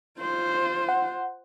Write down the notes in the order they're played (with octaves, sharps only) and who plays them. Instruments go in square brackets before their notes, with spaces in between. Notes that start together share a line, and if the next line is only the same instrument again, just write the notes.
[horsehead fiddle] F4 C5
[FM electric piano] F#5